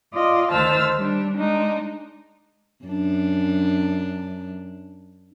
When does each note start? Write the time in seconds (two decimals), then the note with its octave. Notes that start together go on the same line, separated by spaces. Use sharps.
0.12 F4 D5 D#5
0.52 D2 D#3 C5 A5 E6 F6
0.97 G3 D4
1.37 G#3 D4 D#4
2.85 F#2 D4